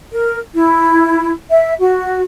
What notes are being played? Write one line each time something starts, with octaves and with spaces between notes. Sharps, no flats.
A#4
E4
E5
F#4